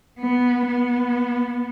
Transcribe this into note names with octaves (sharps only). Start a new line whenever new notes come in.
B3
B3